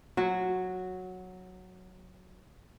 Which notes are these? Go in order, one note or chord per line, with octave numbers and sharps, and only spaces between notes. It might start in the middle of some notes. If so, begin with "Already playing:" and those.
F#3 F#4